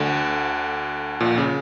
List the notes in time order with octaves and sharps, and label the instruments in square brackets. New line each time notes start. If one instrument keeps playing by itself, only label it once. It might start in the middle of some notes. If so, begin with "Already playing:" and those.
Already playing: [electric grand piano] D2 D3
A#1 A#2
C#3